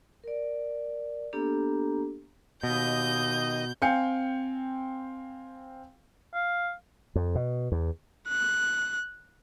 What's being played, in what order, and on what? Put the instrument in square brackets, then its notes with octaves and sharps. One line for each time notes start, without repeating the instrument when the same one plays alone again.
[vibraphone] A#4 D5
A#3 B3 D4 G4 A4 A#5
[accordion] D#2 D#5 [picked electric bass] B2 [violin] G6
[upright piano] C4 F5 G5 G#5 G6 C#7
[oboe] F5
[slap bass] F2
B2
E2
[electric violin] F#6